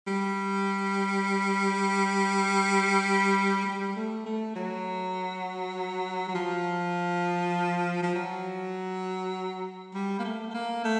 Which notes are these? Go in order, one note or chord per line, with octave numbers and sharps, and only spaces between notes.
G3
G3
A3
A3
F#3
F#3
F3
F3
F#3
G3
A#3
A3
A3
A#3
A3